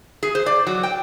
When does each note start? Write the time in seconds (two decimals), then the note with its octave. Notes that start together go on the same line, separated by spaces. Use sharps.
0.23 G#4
0.35 C5
0.46 D5
0.67 F#3
0.83 G5